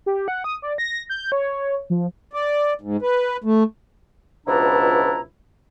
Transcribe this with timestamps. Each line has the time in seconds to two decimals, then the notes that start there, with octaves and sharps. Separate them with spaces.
0.06 G4
0.28 F#5
0.44 D#6
0.62 D5
0.78 A#6
1.09 G6
1.32 C#5
1.90 F3
2.33 D5
2.81 G#2
3.02 B4
3.44 A3
4.47 C#2 B2 F3 D4 E4 A#5